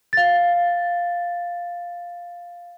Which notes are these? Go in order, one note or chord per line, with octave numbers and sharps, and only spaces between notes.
F5 A6